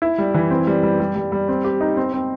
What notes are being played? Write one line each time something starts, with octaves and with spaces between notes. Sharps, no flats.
E4
G3
E3
C4
G3
G3
G3
G3
G3
C4
G4
D#4
C4
C4